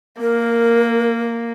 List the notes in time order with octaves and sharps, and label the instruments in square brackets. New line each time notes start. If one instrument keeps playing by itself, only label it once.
[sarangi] A#3 [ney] A#4